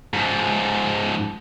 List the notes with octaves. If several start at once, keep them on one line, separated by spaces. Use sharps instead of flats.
G#2 F3